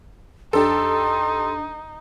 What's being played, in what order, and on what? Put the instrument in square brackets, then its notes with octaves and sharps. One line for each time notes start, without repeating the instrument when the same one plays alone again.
[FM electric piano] F2 D4 [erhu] D#4 [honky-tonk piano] G4 A4 [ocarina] C6